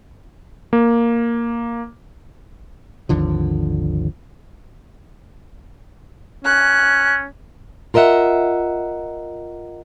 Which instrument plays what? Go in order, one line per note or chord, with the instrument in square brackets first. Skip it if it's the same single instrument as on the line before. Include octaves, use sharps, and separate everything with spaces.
[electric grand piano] A#3
[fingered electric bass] G#1 D#2 D3 F3
[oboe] C#4 [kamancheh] F#6
[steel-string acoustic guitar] F4 A#4 D#5 E5 F#5